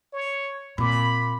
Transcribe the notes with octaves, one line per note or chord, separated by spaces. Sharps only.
C#5
A#2 C4 B5 D6